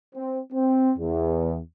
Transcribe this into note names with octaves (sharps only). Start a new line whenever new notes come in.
C4
C4
E2